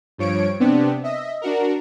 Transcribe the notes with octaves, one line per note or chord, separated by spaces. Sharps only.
G2 F3 C#5 D7
C3 B3 C4 D4
D#5 E5
D4 F#4 A#4